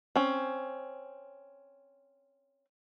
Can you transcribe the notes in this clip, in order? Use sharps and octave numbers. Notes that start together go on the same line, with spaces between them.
C4 C#4